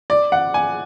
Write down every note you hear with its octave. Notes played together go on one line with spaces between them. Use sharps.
D5
F#5
G#5